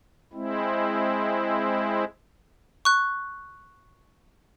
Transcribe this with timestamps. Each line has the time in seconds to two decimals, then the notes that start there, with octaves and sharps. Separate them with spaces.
0.33 G#3 C4 E4
2.85 C#6 F#6